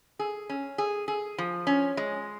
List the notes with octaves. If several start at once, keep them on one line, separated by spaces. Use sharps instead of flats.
G#4
C#4
G#4
G#4
F3
C#4
G#3